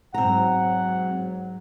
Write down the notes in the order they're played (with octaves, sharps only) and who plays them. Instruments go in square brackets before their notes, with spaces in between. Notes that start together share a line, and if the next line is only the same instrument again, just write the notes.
[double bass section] G#2 F#3 [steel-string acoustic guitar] C4 A#5 [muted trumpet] F#5